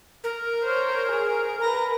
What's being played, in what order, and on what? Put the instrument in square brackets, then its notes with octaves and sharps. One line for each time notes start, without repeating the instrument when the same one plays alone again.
[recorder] A#4
[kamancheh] C5 C#5
G#4
[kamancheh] A#4 B4 [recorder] A#5